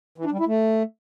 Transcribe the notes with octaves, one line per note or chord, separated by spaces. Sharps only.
E3
D4
G3
E4
A3